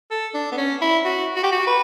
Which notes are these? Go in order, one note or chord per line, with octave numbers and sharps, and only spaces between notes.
A4
D4
B3
C#4
E4
F#4
F#4
G4
F#4
B4